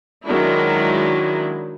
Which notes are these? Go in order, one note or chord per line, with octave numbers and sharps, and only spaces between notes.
D#3 F#3 G#3 D4 E4